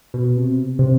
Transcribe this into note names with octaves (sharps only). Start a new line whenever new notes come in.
B2
C3
C3